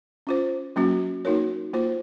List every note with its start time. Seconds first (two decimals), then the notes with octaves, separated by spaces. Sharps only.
0.27 C#4 F4 C5
0.76 F#3 A#3 C#4 F#4
1.25 A#3 D#4 F#4 A#4 C#5
1.73 A#3 F4 C5